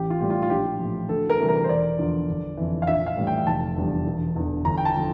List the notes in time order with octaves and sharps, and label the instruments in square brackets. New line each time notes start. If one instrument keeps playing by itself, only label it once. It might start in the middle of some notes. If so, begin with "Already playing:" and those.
Already playing: [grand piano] A1 G4
F4
A2 G3 G4
F4
F4
A#1 G4
A2 F3
D2 A4
A#4
C3 E3 G3
A#4
C5
E1 D5
E2 D3 F3
G1
F2 E3
F5
A#1 E5
F5
A2 E3 G3
G5
F1 A5
E2 D3 G3
E1
E2 D3
G1 A#5
G5
A5
D3 F3